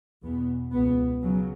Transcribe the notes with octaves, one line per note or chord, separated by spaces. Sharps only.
E2 B2 B3
C#2 B2 B3
C#3 F#3